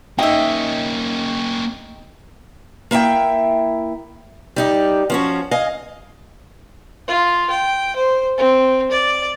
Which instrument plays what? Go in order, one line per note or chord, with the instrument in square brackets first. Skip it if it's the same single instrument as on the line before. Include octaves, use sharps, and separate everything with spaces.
[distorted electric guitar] A#3 C#4 [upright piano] D#4 G5 [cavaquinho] D#5 E5
[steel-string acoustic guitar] A#3 E4 E5 G5
G3 D#4 G4
F3 C#4 F#4
D#5 F5 G#5
[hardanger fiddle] F4
G5
C5
C4
D5